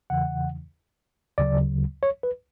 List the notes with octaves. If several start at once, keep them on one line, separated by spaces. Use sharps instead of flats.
E2 C#3 E3 F#5
D2 C#3 F#3 D5
C#5
B4